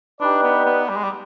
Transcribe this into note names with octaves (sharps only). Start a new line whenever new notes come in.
D4 D#4 G4 B4 D5
B3
B3
G3
G#3
G3